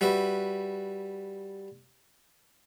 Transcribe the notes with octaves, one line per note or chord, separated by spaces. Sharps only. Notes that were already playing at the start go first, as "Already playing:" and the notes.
G3 F#4 B4 E5